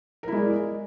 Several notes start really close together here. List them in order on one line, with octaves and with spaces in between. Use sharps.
A#4 E4 G#3 D5